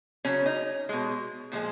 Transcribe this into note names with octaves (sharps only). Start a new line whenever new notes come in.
C#3 F#3 C#4
D#4
B2 G#3
A#2 F3 G#3